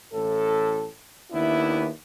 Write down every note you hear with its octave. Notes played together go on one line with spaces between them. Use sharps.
A1 A2 A4
D#2 B3 D4 E4